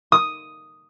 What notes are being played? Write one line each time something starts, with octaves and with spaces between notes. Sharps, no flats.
D#6